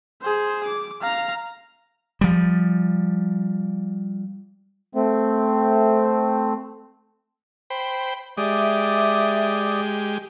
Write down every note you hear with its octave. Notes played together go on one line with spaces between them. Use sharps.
G#4 C5
D6
F5 A#5
F3 G3
A3 C4
C5 G5 B5
G#3 G4 D5 E5 D6 D#6